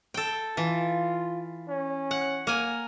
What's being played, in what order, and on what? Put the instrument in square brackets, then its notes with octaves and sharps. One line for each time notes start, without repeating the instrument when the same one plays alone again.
[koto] A4 G5
[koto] E3 [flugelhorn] F4
[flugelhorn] C#4
[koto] F#5
A#3 G#5